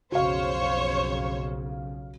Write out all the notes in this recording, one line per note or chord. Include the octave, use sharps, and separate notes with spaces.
B1 F2 C#3 F#4 C5 C#5 F5